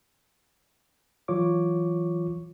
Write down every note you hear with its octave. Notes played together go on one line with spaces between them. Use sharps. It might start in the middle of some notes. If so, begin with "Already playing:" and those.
E3 F#3 F4 C#5 C#6 D6